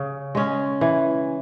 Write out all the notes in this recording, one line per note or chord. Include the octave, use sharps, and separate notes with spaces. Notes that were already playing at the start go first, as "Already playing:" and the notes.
Already playing: C#3 C#4
G#3 C#4
E3